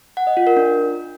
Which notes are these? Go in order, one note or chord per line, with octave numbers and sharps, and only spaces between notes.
F#5
D#5
F4
A#4
D4